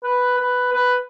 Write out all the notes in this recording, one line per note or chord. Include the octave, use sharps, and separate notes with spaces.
B4
B4
B4